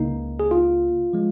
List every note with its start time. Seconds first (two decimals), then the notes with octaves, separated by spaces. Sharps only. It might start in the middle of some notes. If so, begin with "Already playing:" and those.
Already playing: C#2 C#3 A#3 D#4
0.40 G#4
0.51 F4
1.13 F3 G#3